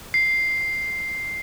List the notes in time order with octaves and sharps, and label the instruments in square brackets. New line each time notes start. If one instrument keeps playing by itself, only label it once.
[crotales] C7